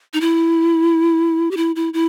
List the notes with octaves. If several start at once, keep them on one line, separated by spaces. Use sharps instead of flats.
D#4
E4
G4
E4
E4
E4